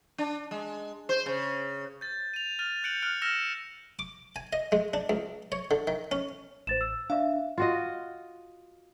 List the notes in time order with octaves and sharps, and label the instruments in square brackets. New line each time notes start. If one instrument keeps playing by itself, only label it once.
[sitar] D4
G#3
C5
C#3
[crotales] G6 A6
D#7 F7
F6 A6 D#7
F#6 G6 C#7 D7 F#7
F6 F#6 D7
E6 F6 A#6 C#7 E7
[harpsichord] D6
G#5
D#5
G#3
D4
C#2
C#5
D3
D#3
C#4
[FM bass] A1 [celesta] C5 A6 E7
[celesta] E6
[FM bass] D4 [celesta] E5 F5
[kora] F4 F#4 D#5